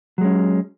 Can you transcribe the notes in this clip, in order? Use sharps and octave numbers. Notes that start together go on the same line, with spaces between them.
F#3 G#3 C#4